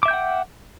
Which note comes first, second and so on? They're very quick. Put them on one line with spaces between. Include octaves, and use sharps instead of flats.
D6 E5 G6 G5 F#5